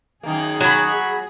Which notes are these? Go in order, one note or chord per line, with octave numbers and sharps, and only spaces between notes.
F#2 D#3 A#3 G#4
F#3 C#5 B5